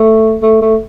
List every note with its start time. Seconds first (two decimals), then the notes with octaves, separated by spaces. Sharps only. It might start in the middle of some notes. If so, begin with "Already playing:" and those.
Already playing: A3
0.42 A3
0.62 A3